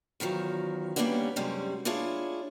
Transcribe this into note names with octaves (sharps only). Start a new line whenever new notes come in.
E2 D#3 F3 F#3
G3 A#3 B3 C#4 D4 F#4
F#2 C3 G3 G#3 C#4
D4 E4 F4 G#4 C#5